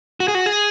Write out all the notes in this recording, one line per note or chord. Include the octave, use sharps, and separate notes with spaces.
F#4
G#4
F#4
G#4